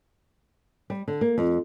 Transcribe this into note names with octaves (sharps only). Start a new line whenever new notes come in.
G3
D3
A#3
F2